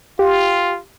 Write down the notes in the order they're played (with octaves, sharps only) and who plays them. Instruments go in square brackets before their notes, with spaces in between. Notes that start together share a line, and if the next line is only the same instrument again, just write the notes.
[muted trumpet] F4 [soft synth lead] G4